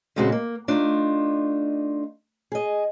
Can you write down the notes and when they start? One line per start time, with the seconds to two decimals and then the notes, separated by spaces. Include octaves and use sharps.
0.16 A#2 C#3 G#3 C4 F#4 G4
0.32 A#3
0.68 A3 D4 D#4 F4
2.52 G#4 D#5